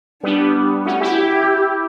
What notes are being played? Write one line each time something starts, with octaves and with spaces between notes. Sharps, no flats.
G3 B3 D4
A3 C#4 F#4
E4 G4
G4